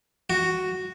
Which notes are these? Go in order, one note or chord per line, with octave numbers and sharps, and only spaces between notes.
F#4